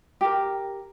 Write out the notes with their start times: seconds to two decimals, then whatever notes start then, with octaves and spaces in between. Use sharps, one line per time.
0.21 G4 A#4